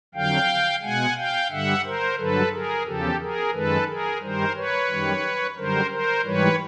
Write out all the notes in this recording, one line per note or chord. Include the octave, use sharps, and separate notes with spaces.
F2 D3 F#3 F5 G5
B2 G#3 F#5 G#5
F5 G5
G2 D3 G3 E5 F#5
A#4 C5
G2 D3 F#3 A4 B4
G#4 A#4
E2 C#3 F3 G4 A4
G#4 A#4
F#2 D#3 G#3 A4 B4
G#4 A#4
G2 D#3 G3 A#4 C5
B4 C#5
F#2 D#3 G3
F#2 D3 G3 A#4 C5
A#4 C5
G#2 E3 G3 B4 C#5